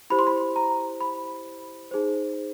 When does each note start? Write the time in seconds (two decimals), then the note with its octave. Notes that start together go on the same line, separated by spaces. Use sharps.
0.10 E4 G4 C5 B5
0.19 C6
0.27 B5
0.56 A#5
1.01 B5
1.91 D#4 G#4 C5